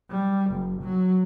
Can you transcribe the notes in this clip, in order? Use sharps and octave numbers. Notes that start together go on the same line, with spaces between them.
G3
F#1
F#3